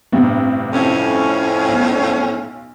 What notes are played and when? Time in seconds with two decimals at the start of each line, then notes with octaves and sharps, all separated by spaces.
0.12 A1 G2 C3
0.72 F2 A2 C#4
1.68 B1